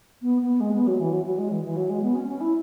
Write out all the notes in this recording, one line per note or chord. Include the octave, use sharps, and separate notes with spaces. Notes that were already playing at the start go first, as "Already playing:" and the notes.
B3
B3
G#3
B3
F#3
E3
F#3
F#3
G#3
E3
E3
F#3
G#3
B3
C#4
C#4
E4